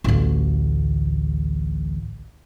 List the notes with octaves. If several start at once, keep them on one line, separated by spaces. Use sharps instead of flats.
A1 D2